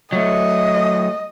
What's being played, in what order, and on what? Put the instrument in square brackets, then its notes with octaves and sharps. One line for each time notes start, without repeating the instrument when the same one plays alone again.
[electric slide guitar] F#3 A3 [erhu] D#5